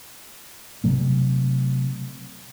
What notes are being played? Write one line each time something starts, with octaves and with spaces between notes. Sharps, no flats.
C3 F#3 A3